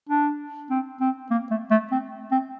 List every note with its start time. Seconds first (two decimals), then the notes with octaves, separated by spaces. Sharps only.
0.09 D4
0.70 C4
1.01 C4
1.31 A#3
1.51 A3
1.71 A3
1.92 C4
2.32 C4